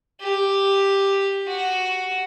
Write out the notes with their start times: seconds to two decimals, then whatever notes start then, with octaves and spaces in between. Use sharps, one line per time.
0.21 G4
1.48 F#4